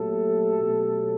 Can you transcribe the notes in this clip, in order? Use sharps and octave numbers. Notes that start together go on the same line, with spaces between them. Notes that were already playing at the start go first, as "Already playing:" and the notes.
Already playing: A#2 F#3 A3 G4 A4
B2 F#3 A3